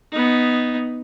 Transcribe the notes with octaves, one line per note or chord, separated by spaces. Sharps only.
B3 D#4